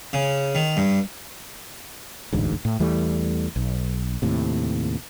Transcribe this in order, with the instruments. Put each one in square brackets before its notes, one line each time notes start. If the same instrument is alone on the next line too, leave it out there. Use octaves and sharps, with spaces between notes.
[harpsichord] C#3
D#3
G2
[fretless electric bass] E1 A1 D2 G#2
A2
E2 E3 G3 A3
B1
D#2 A2 C3